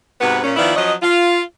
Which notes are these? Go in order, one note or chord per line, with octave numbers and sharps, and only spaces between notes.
G#2 C3 B3 F#4 B4
A#2 C#4
D#3 F3 B3 E4 F4 D5
F3 F#3 C#4 D#5
F4